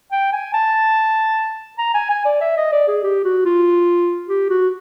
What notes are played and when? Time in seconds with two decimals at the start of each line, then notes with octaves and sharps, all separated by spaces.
0.12 G5
0.33 G#5
0.53 A5
1.78 A#5
1.94 G#5
2.10 G#5
2.25 D5
2.41 E5
2.57 D#5
2.72 D5
2.88 G#4
3.03 G4
3.24 F#4
3.45 F4
4.29 G4
4.50 F#4